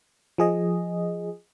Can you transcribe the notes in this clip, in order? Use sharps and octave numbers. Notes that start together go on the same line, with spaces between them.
F3 G#4 D#5